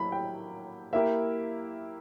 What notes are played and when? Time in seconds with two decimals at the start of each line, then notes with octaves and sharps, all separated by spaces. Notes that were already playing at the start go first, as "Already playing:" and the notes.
Already playing: F#3 A#3 E4 G4 B5
0.12 G5
0.93 A#3 E4 G4 A#4 E5